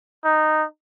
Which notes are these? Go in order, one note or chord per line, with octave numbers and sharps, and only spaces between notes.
D#4